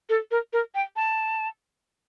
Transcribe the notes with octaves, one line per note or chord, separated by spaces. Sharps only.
A4
A#4
A#4
G5
A5